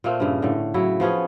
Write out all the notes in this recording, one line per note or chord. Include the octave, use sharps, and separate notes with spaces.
A#2 A3 A#3 C4
G2 C#3
A2 D3
C#3 F#3 E4
F3 B3 C#4 G#4